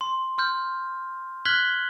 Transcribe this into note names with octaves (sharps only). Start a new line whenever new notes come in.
C6
C6 F6 G6
F6 F#6 G#6 B6 F#7 G7